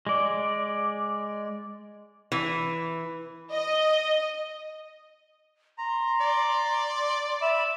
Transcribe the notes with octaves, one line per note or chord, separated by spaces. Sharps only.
G#3 D5
E3
D#5
A#5 C6
D5
E5 B5 E7